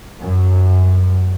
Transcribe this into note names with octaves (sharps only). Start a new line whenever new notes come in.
F#2